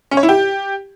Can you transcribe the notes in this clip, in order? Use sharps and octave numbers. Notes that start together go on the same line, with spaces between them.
C#4
C#5
E4
G4